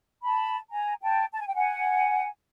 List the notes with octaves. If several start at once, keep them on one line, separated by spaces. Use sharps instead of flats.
A5 B5
G#5 A#5
G5 A5
A5
G#5
G5
F#5 G#5